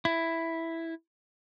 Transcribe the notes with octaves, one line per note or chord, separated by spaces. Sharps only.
E4